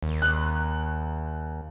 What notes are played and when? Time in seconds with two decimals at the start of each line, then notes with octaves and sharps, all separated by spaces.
0.02 D#2
0.22 F#6